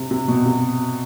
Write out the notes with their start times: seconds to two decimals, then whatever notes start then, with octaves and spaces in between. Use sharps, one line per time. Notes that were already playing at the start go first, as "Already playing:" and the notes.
Already playing: C3
0.11 C3
0.28 B2
0.46 C3